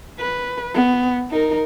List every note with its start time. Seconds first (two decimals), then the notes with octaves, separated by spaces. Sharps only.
0.19 B4
0.74 B3
1.31 D#4 A#4